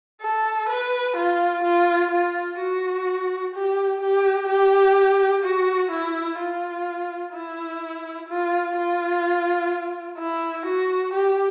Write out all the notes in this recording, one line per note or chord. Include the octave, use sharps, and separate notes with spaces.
A4
B4
F4
F4
F4
F#4
G4
G4
G4
F#4
E4
F4
E4
F4
F4
E4
F#4
G4